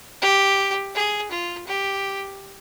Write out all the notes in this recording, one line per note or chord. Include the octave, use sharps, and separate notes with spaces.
G4
G#4
F4
G4